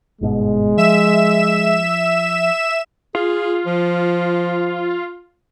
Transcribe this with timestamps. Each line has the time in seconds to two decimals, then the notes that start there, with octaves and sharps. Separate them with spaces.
0.21 G1 G#2 B2 G#3
0.77 F3 E5 E7
3.15 F4 G#4
3.66 F3